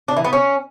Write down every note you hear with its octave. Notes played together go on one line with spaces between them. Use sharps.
D4
E3
B3
C#4